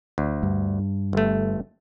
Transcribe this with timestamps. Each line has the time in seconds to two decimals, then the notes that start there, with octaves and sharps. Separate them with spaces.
0.18 D2
0.43 G2
1.13 G1 A3